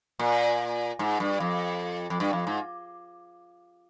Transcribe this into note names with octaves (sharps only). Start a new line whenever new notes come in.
A#2
G#2
G2
F2
F2
G2
F2
G#2